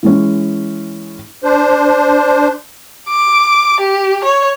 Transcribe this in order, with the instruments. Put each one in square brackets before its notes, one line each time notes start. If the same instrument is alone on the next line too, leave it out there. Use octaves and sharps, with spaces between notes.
[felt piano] E3 G#3 C#4
[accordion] D4 C5
[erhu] D6
G4
C#5